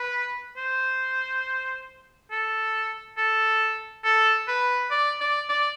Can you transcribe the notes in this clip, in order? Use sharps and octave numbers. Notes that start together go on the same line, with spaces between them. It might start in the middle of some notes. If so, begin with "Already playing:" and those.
Already playing: B4
C5
A4
A4
A4
B4
D5
D5
D5